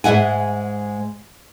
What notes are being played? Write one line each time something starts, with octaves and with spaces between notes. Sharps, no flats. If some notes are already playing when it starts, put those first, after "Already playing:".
G#2 G#3 E5 F#5 G#5